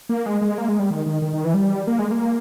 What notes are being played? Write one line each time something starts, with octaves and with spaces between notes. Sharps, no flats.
A#3
G#3
G#3
A#3
G#3
G3
D#3
D#3
D#3
D#3
E3
G3
A#3
G#3
A#3